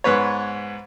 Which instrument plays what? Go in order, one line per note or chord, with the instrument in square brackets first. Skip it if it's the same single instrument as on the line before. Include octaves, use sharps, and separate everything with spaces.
[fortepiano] G#2 B3 B4 C#5